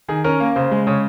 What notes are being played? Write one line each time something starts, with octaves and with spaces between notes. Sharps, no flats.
D#3 G#4
C#4 A#4
A#3
C#3 C5
G#3
C#3 C#5